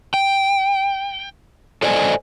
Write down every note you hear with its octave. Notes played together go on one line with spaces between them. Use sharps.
G5
A4 C5 D5 D#5 G#5